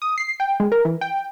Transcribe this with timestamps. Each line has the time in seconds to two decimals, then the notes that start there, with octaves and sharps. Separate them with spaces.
0.02 D#6
0.18 C7
0.40 G5
0.60 G#3
0.72 A#4
0.85 E3
1.01 G5